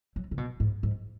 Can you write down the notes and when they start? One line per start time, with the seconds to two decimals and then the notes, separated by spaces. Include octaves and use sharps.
0.16 F#3
0.31 C#3
0.38 B2
0.60 G#2
0.83 G#2